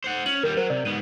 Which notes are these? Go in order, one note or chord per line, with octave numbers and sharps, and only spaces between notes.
C5 F#5
C#4 F#7
D#2 G3 A#4
F#3 A#4 C5
C3 D5
G#2 B3 D#7